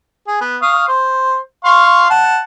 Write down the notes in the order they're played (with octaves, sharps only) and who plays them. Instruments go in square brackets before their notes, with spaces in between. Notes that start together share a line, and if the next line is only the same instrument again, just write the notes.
[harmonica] G#4
B3
F5 C#6 D#6
C5
F5 C6 C#6
F#5 A5